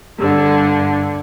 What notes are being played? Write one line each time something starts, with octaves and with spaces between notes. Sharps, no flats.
G2 D3